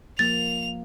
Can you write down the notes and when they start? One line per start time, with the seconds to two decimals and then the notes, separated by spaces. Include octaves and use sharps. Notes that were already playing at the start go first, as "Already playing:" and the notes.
0.19 F3 A#3 A6 F7